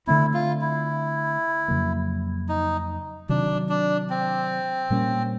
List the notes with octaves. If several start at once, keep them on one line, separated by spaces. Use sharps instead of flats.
D3 F3 A3 C4 E4
F4
E4
F2 C#3 F#3 A#3
D#4
C3 D#3 F#3 D4
D4
C4
A#2 G3 A#3 C#4